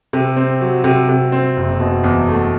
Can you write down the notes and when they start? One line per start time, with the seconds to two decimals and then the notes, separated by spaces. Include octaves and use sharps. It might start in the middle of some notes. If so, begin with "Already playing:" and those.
0.13 C3
0.37 C4
0.61 F#3
0.84 C3
1.09 C3
1.32 C4
1.57 F#1
1.80 B2
2.04 E2
2.28 A3